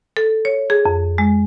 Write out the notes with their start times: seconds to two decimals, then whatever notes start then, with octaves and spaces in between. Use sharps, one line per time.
0.17 A4
0.45 C#5
0.70 G#4
0.85 F2
1.18 G#3